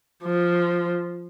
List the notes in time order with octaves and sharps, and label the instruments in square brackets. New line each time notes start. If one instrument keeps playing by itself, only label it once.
[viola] F3